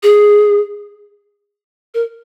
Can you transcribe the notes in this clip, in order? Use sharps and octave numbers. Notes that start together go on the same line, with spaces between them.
G#4
A#4